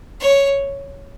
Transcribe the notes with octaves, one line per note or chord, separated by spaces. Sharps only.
C#5